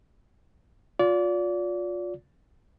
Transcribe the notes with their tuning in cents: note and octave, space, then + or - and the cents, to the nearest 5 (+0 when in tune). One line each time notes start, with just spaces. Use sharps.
F4 +30 D5 -30